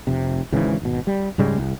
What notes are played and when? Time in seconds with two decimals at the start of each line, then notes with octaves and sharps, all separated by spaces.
0.07 F1 C3
0.52 G#1 G#2 C#3 E3
0.82 G#1 B2
1.07 G3
1.38 G#2 C#3 G3 G#3
1.58 C2